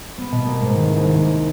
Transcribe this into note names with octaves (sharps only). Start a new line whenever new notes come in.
B3
B2
A#3
G#2
D#3
C2
A#3